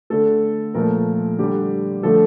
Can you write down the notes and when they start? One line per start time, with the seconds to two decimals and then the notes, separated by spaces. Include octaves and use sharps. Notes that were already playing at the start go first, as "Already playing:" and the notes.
0.10 D3 A3 A4
0.74 A#2 F3 A3 A#4
1.39 D3 G3 G4
2.03 D3 F3 A3 A4